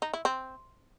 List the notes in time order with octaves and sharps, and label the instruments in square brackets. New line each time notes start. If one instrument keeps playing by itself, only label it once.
[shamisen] D#4
E4
C4